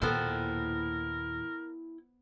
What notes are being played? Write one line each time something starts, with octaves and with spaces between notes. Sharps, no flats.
D#2 A#2 B3 E4 A4 A#4 C5 G5